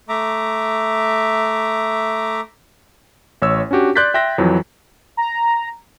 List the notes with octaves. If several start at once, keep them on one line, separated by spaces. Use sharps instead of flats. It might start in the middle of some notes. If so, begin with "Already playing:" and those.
A3 E5 A#5 D6
A1 C#5 E6
C#4 D4 F#4 G4
D5 C6 F#6 G6 A6 B6
E5 G5 C6 F#6 A#6
F2 E3 F#3
A#5